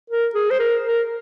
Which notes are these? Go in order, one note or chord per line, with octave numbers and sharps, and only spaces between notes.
A#4
G#4
C5
A#4
A#4